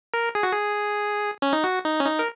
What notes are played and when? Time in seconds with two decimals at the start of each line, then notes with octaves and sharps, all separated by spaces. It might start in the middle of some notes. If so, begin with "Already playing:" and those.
0.14 A#4
0.35 G#4
0.43 F#4
0.52 G#4
1.42 C#4
1.53 D#4
1.64 F#4
1.85 D#4
2.00 C#4
2.06 D#4
2.19 A#4